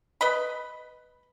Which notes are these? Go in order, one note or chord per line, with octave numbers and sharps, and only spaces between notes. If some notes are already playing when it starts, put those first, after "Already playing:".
B4 D#5 B5